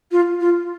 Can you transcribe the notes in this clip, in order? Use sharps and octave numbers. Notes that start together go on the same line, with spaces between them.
F4
F4